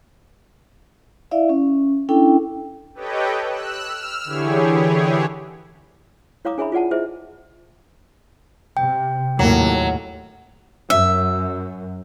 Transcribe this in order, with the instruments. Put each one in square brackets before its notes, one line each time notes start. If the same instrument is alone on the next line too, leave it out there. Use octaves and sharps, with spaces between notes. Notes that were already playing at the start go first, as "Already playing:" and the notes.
[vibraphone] E4 D5 E5 F5
C#4
C#4 D4 E4 A4 G5
[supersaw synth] G4 A4 B4 C#5 D#5 G5
E6 F#6
E6 F6
D3 E3 E4 G4 G#4 C#5
[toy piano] E4 C#5 F5 A#5 D6 D#6
D4 G#4 C#5 E5 A#5 B5
F4 G#4 D5 F#5 A5
E4 G#4 C5 D#5 E5
[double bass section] C3 [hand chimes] G5
[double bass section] D#2 A2 A#3 [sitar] F#3
[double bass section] F#2 [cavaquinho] E5